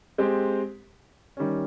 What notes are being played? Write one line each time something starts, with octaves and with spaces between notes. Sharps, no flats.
G#3 C4 G4
D#3 G3 C#4